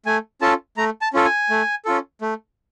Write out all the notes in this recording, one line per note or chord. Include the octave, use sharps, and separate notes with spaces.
A3 G#5
C#4 F4 A4 A5
A3 A#5
A5
C#4 F4 A4
G#5
A3
C#4 F4 A4
A3